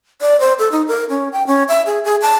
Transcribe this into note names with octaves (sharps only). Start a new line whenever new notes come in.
D5
C5
A4
D#4
A#4
C#4
G5
C#4
E5
G#4
G#4
A5